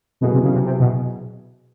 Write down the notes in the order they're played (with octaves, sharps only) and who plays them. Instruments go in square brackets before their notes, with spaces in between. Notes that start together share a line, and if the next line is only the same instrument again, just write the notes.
[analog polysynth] B2 [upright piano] F#3 B3 E4 G#4
[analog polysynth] C3
C#3
C3
C3
B2